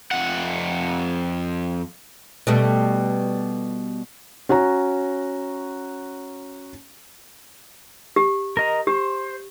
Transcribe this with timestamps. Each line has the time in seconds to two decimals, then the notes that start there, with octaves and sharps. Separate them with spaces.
0.11 F2 F#5
2.47 B2 G3 A3
4.49 C#4 F#4 C#5 A#5
8.16 G4
8.57 A#4 D#5 A#5
8.87 G4 C5